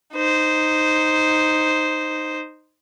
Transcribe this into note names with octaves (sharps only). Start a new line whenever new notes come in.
D#4 C5